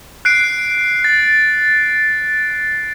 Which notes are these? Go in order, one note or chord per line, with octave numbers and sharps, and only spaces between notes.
F#6 C7 D7
A6